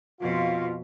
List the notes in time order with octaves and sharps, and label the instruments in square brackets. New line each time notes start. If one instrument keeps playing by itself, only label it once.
[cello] F2 B2 [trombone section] F4